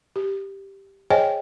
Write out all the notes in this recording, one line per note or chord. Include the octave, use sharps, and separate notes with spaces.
G4
G#4 C5 C#5 D#5 G5 G#5